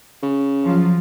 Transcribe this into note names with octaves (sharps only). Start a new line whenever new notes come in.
C#3
F3 F#3 F4